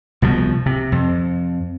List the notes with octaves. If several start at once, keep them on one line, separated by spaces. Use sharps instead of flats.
C2 B2 F3
C3
F2